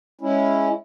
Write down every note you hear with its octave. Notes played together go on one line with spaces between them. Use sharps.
G#3 C#4 E4